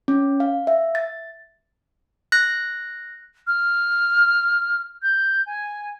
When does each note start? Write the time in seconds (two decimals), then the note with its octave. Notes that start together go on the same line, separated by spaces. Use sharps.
0.08 C#4
0.40 F5
0.67 E5
0.95 A6
2.32 F#6 A#6
3.47 F6
5.02 G6
5.46 G#5